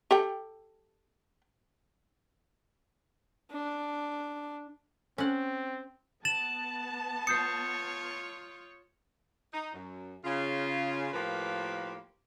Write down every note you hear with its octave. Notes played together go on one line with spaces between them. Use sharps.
G4 A4 G5
D4
C4 C#4 F#5
B3 A5 A6 E7 F#7
F4 C#5 D#6 G6 C7 C#7
D#4
F#2
C#3 F4
A2 F3 A#3 G4 A#4 B4